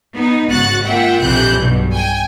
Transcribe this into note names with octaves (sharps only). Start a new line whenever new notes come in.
B3 D#4
G#1 C#3 F#4 F#6 A6
A#3 F4 E5 F#5 G5
A#1 F2 C3 E3 F#6 G6
B1 G2 B2
G5 G#5